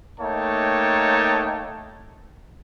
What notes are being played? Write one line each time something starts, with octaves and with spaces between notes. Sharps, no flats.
A3 A#3 D#4 C#5 G5 A5